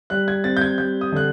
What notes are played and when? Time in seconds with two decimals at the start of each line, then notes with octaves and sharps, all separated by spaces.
0.10 G3 F#6
0.28 G#6
0.44 C4 A6
0.57 G6
0.62 G#6
0.78 G3 G6
1.01 D#6
1.12 D3 F#6